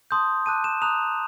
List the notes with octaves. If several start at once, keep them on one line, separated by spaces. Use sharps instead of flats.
A5 C6 D#6 G6
A5 D6 F#6 D#7
E7
A#5 D#6 F#6 F7